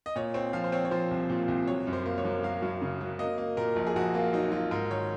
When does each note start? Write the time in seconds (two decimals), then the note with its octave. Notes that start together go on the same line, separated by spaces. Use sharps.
0.06 D#5
0.16 A#2 C#5
0.34 C4 C#5
0.53 F3 F5
0.64 C5
0.72 C4 C#5
0.85 C#5
0.91 F3 C5
1.11 C2
1.30 A#2
1.48 C2
1.68 F#3 C#5
1.87 F#2
1.93 C5
2.06 A#3
2.18 C#5
2.25 F#2
2.43 F#3 F5
2.62 F#2
2.82 C#3
3.01 F#3
3.19 A#3 D#5
3.38 A#3
3.57 A#2 A#4
3.76 A#1
3.87 G#4
3.96 A#1 F#4
4.14 A#3 F4
4.33 F#3 D#4
4.52 F#3 F4
4.71 G#2 A#4
4.91 D#3 C#5